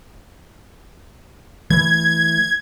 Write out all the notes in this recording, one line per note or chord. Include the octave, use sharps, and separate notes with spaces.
E3 A3 G#6